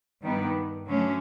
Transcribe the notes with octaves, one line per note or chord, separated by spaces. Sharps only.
G2 D#3 G3 B3
D3 F#3 A3 C#4